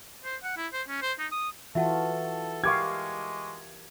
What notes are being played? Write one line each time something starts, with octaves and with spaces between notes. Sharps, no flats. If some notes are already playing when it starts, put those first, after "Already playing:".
C5
F#5
E4
C5
C#4
C5
D#4
D#6
E3 F4 F#4 A4 E5 F#5 A5
G#3 G4 A#4 F5 C#6 D6 G#6